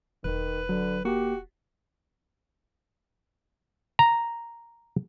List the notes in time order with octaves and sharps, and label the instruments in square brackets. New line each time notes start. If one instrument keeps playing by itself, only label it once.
[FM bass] E1 [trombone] D#3 [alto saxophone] B4
[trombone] D3 [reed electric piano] F#3
[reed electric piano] A#3 [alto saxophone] F#4 [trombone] G4
[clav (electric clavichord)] A#5